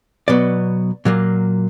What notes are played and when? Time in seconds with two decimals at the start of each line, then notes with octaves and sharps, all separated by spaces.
0.28 B2 F#3 B3 D5
1.05 A#2 F#3 A#3